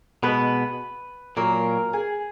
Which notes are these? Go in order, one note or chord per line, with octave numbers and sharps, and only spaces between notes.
B2 G#3 B3 B4
A#2 F#3 A#3 A#4
G#4